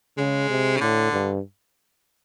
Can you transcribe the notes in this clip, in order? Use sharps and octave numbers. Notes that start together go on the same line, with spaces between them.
C#3 G#3
C3
C#3
A2 D3
G2